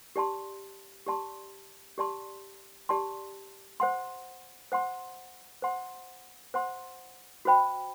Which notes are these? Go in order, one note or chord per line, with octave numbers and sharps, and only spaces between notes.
G4 D5 A5 C6
G4 D5 A5 C6
G4 D5 A5 C6
G4 D5 A5 C6
C5 F#5 C6
C5 F#5 C6
C5 F#5 C6
C5 F#5 C6
F#4 C5 G5 B5